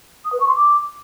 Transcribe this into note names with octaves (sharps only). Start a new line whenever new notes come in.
D#6
B4
C#6
C6
D6